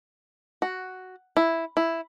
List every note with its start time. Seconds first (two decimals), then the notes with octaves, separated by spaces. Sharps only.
0.62 F#4
1.37 E4
1.77 E4